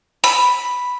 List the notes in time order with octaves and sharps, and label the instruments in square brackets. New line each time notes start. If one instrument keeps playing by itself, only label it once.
[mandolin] B5